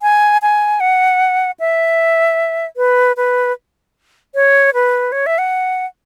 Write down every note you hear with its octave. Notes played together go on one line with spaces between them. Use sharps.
G#5
G#5
F#5
E5
B4
B4
C#5
B4
C#5
E5
F#5